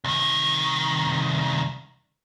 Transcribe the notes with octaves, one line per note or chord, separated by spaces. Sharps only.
C2 D#3